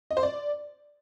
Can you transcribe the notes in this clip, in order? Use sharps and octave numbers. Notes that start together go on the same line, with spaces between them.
D#5
C5
D5